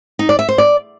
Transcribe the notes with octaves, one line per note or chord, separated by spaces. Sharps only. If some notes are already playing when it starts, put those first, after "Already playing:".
D#4
D5
E5
C5
D5